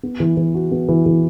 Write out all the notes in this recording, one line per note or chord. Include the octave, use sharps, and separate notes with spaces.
B3
E3
E3
F#4
B3
E3
E3